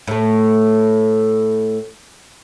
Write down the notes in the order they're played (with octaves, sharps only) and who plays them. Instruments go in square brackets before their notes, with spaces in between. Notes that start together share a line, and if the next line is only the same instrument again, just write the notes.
[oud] A2 A3